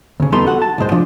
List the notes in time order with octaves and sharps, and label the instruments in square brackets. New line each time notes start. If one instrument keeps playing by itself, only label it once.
[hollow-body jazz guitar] D2 C#3
E2 G3 B3 D#4 A4 C6
F#4 A4 F#5
A5
C2 G#2 G#3 C5
F3 D4